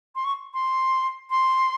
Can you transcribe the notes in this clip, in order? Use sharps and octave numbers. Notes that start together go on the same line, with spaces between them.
C6
C#6
C6
C6